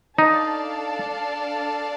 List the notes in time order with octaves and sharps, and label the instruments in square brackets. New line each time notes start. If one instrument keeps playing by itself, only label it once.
[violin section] D4 A4 D5 F5 A5 [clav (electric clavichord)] D#4